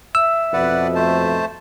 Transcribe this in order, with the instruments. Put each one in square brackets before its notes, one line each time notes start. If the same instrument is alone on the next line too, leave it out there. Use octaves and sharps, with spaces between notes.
[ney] E5 [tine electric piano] E6
[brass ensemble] F2 B2 [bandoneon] B4 D5 F#5
[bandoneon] A3 C5 A5